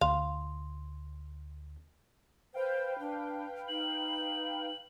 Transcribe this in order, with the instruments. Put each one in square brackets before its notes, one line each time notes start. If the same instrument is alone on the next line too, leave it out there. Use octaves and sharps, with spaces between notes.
[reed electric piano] D2 [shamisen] F5 [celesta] C6
[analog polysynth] B4 F5 G5 [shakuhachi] C5
[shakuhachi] D4
[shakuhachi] D#4 [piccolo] F#7